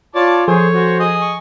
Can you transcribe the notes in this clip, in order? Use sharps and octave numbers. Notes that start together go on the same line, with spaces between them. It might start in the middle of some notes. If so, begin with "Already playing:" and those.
F4 C#5 D5 A5 D6
F3 G#4 A4 C5 C#5 G#5
F#4 C5
G#4 D#5
C#6